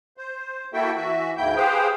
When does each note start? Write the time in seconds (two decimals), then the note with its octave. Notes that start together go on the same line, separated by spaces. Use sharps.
0.17 C5
0.73 A#3 E4 F#4 A4 E5 G5
0.95 E3 F#4 E5
1.37 D2 G#2 A#3 E4 G5 G6
1.56 G4 G#4 B4 C5 F5 G5